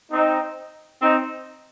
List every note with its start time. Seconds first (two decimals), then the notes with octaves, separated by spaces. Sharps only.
0.12 C4 D#4
1.02 C4 D#4